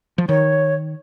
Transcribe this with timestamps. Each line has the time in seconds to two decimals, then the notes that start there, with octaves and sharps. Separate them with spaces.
0.18 F3
0.29 D#3 C#5